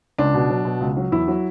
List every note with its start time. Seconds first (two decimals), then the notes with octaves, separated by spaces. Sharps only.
0.18 C#2 D4
0.34 B2
0.50 F#3
0.65 B2
0.81 C#2
0.97 F#3
1.12 E2 E4
1.28 F#3